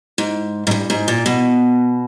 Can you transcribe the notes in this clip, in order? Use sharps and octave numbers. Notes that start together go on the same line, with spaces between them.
G#2
G#2
G2
G#2
A#2
B2